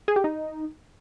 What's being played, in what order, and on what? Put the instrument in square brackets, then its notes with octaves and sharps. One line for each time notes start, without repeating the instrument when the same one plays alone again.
[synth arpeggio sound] G#4
G4
D#4